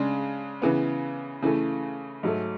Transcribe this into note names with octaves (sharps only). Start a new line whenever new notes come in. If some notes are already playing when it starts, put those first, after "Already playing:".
Already playing: C#3 G#3 D4
C#3 E3 B3
C#3 E3 A3
G#2 F#3 A3